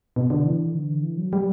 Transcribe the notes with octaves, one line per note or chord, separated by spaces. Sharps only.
B2
D3
E3
D3
E3
F#3
G3